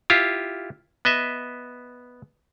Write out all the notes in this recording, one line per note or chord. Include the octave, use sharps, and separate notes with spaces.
E4 F4 G4 F5
B3 D#5 E5